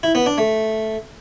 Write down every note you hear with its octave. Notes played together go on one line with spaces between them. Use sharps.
E4
B3
D4
A3